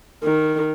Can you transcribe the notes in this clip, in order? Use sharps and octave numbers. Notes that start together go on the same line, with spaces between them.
D#3